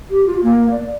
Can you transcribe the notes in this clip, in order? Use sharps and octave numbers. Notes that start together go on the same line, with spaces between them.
G4
F4
A#3
D5